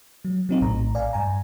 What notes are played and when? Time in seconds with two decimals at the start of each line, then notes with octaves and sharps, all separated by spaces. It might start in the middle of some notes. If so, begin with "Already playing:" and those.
0.25 F#3
0.49 F#3 C4 D#4
0.61 A#1 A2 A#5
0.95 D5 F5 G#5
1.13 G2 G#5 A#5